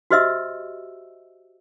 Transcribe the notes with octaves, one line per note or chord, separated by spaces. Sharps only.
F#4 G4 C5 D#5 E5 E6